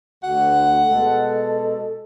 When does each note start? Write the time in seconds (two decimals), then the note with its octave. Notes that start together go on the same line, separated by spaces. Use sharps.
0.24 D2 D3 F#4 F#5
0.87 B2 G#3 A4